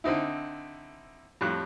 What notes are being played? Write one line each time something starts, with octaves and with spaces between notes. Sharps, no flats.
D3 C4 D#4 E4
F2 A2 G3 F#6